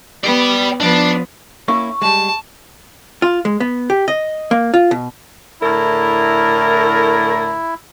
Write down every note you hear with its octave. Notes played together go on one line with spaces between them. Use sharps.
B3 D5 G5
F3 B3 D4 D5
A#3 C#4 E4 C#6
G3 G#3 A5
F4
G#3
B3
G4
D#5
A#3
F4
B2
A2 D3 E4 A#4